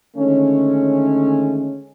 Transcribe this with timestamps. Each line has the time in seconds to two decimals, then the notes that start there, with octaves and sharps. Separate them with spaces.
0.17 D3 D#3 G#3 A3 C#4